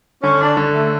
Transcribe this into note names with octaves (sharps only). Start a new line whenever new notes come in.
D3 C#4
D4
D3
A3